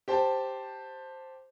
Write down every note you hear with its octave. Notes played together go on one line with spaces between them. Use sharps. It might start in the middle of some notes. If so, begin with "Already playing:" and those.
G4 C5 A5